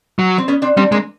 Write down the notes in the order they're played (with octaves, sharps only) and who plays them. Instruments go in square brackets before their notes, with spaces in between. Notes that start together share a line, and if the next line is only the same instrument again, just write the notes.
[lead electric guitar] F#3
[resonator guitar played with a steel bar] C4
B3 C#4
C4 D4
[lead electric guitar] G3 [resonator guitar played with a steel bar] C4 D4
[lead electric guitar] G#3 [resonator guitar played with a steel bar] A#3 C4